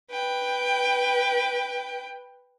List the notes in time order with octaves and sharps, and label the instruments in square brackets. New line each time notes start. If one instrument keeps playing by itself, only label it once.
[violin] B4 G5